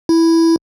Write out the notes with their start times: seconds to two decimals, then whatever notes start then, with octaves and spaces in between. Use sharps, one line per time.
0.09 E4